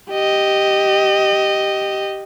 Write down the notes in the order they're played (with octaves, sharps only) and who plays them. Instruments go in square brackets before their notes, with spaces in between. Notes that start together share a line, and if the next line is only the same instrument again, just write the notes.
[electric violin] G4 D#5